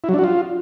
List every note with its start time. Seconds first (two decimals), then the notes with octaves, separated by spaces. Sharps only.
0.04 E4
0.09 F#3
0.14 D4
0.19 F#4
0.24 F4